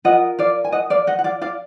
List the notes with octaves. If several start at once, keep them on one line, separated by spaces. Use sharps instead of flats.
F4 A#4 D#5 F#5
D5 F5
G#5
D#5 F#5
D5 F5
D#5 F#5
F#5
D5 F5
D5 F5